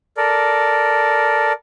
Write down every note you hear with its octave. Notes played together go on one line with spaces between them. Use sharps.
A4 A#4 D5